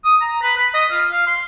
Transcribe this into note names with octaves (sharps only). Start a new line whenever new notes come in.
D#6
A#5
B4
B5
D#5
F4
F5
C6